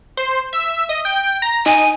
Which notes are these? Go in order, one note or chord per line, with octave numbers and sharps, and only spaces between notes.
C5
E5
D#5
G5
A#5
D#4 G#5